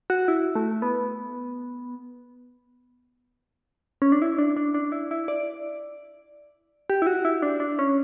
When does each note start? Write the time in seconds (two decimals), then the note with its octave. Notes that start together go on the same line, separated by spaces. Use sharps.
0.10 F#4
0.28 E4
0.55 A3
0.82 B3
4.02 C#4
4.12 D4
4.22 E4
4.38 D4
4.57 D4
4.74 D4
4.92 E4
5.11 E4
5.28 D5
6.90 G4
7.02 E4
7.07 F#4
7.25 E4
7.42 D4
7.60 D4
7.79 C#4